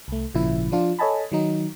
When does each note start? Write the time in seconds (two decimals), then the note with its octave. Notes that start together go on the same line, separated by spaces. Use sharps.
0.08 C2 A3
0.34 G#1 A#2 C#3 F3 E4
0.72 F3 D4 F4
0.99 A4 C#5 D#5 G#5 A5 B5
1.32 D#3 F#3 D#4